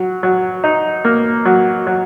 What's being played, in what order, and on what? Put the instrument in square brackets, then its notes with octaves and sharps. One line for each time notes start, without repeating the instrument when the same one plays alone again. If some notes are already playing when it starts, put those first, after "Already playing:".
Already playing: [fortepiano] F#3
F#3
D#4
A#3
F#3
F#3